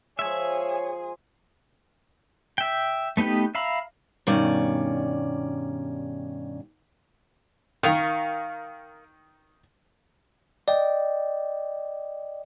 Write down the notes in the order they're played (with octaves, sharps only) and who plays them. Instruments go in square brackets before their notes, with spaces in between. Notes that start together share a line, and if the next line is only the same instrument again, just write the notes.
[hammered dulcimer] F3 G#3 [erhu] G#4 [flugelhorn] C#5 [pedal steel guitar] E5 G#5
[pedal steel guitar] E5 G5
A3 B3 D#4 G4 B4
E5 F5 A#5 B5
[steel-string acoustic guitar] G2 B2 D#3 C#4 D5
[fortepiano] D#3 [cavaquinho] A#4 F5 C#6
[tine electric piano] D5 D#5 G5